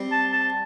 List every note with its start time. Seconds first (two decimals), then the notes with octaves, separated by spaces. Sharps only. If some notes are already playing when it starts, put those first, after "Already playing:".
Already playing: G3 C4
0.12 A5
0.33 A5